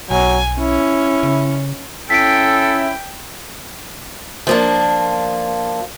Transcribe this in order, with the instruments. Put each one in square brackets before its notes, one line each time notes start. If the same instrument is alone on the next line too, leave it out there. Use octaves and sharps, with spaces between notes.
[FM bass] B1 [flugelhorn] F#3 [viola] G#5
[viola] C#4 [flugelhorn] E4
[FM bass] C#3
[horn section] C#4 E4 [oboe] A4 [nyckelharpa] G5 [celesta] B6 D7
[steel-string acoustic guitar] F3 A#3 D4